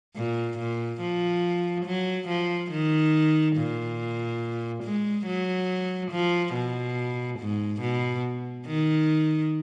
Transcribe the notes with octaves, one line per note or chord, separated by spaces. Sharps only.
A#2
A#2
F3
F#3
F3
D#3
A#2
G#3
F#3
F3
B2
G#2
B2
D#3